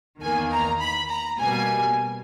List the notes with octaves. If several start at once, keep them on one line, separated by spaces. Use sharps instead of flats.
E2 D#3 A#3 G#5
A#5
B5
A#5
B2 G3 A#3 G#5